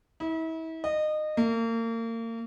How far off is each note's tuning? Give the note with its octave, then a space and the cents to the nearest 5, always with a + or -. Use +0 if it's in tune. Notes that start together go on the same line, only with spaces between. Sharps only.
E4 -35
D#5 -25
A#3 -35